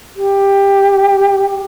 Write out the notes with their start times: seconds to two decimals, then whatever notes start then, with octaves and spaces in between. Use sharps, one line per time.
0.16 G4